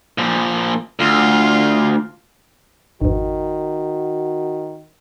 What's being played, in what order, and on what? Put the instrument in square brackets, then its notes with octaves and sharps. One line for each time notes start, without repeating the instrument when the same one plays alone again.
[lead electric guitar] A#2 F3
[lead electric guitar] D2 [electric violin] F4
[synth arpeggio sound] G#1 F2 [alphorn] D#3 [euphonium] F#4